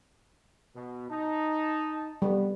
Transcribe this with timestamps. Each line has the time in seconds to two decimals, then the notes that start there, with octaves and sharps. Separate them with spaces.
0.76 B2
1.10 D#4 A5
2.22 G3 B3